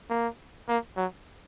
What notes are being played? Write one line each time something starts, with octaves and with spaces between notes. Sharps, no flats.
A#3
A#3
F#3